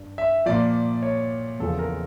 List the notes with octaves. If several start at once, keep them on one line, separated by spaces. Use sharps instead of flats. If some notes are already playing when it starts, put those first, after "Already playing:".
Already playing: G2
E5
A#2 F3 D5
C#5
E2 C#3 F3 A4
A#4